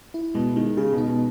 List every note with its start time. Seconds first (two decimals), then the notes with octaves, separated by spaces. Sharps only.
0.14 E4
0.35 B2 G#3
0.56 D#3 G#3
0.77 C#3 G#4
0.92 B2
0.98 D#4
1.08 B2